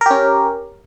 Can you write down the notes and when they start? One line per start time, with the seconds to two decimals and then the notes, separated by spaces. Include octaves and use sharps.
0.01 A#4
0.06 G4
0.11 C#4